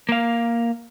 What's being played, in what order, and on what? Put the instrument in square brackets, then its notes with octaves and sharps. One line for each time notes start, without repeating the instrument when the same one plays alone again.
[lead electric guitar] A#3 F5